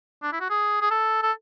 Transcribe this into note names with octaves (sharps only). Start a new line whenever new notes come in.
D4
E4
F#4
G#4
G#4
A4
A4